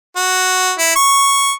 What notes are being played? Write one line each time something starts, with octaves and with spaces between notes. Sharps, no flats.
F#4
E4
C#6